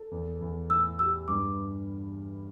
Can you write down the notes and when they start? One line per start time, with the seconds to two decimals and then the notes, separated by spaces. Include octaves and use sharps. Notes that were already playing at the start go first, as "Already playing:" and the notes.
Already playing: A4
0.11 E2
0.41 E2
0.70 A2 E6
0.99 G4 E6
1.28 G2 D6